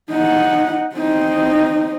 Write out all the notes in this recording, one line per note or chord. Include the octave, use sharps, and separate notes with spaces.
D#4 F#5
C4 D#4